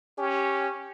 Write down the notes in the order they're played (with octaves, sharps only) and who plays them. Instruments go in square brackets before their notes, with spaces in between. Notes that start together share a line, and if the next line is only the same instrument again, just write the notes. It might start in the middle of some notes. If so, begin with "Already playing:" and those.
[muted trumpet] C#4 [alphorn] G4